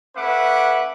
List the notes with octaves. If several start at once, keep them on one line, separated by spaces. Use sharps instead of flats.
A3 C#4 B4 E5 F#5 D6